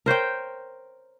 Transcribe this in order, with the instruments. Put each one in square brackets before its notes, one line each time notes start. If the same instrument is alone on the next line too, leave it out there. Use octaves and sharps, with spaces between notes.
[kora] A#4 C5 C#5 G5